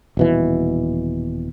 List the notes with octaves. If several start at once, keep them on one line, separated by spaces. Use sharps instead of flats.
D#1 B2 E3